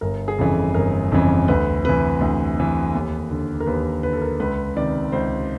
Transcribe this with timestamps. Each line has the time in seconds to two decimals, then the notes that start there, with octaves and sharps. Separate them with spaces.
0.01 G1 A#4
0.28 G#4
0.38 F2 C#3 E3 A4
0.74 G1 A#4
1.12 F2 C#3 E3
1.48 D2 B4
1.84 C3 E3 B4
2.21 D2
2.57 C3 E3
2.94 D#2
3.31 D3
3.60 A#4
3.66 D#2 B4
4.03 D3 B4
4.13 A4
4.22 A#4
4.40 C#2 B4
4.76 C3 D#3 D5
5.12 C#2 C5